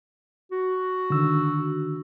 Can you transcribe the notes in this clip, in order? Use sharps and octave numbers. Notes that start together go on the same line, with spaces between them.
F#4
D3 D#3 E6